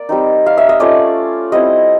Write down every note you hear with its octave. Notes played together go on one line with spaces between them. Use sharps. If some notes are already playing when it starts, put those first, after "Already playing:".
Already playing: A#3 D5
G3 C4 D#4
F5
E5
D#5
A3 C#4 F4 D5
G3 C4 E4 D#5